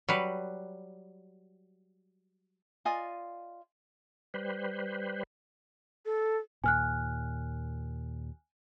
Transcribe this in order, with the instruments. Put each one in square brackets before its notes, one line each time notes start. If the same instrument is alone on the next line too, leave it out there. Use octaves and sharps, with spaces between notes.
[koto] F#3 G3 B4
[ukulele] F4 D5 D#5 G#5
[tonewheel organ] G3 B4 C5
[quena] A4
[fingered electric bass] D#2 A#2 [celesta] G#5 F6 F#6